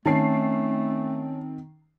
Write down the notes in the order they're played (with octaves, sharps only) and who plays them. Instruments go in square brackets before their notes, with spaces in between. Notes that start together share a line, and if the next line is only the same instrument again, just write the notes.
[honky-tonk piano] D#3 C7 [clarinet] A3 [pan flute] C4 [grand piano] C#4 A5